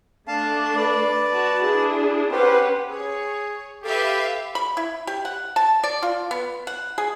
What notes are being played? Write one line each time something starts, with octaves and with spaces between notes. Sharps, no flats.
A3 D4 F5 A5
B4 D5
F#4 A5
D4 E4 G#4
C#4 G4 B4 C5 F#5
G#4 C#5
G4 A4 B4 E5 F5
B5
E4
G4
F#5
A5
D5
F4
B3
F#5
G#4